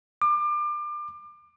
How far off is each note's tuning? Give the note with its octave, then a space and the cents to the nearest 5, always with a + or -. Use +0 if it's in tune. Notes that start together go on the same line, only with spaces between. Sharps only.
D6 +30